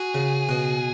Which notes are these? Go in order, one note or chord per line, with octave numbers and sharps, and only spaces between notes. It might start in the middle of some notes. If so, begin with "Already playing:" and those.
Already playing: F#4 G#4
C#3
B2